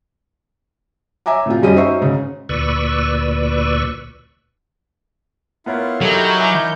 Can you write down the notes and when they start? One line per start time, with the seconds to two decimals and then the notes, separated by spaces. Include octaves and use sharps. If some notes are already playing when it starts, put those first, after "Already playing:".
1.26 C#5 E5 G#5 A#5 D6
1.46 A2 C3 F4
1.62 F#2 G3 C#4 G#4 D#5 D#7
1.76 D#4 F#4 C5 E5 C#6
2.01 G#2 C#3
2.49 D2 A#2 B4 D5 C#6 E6
5.66 B3 E4 F4 A#4 C#5
6.01 F#3 D#4 E4 G4 A4 A#4 C#5 G6
6.39 E5 G#5 D6